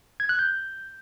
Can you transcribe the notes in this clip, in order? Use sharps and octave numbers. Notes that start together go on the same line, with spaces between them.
G#6
F#6
G6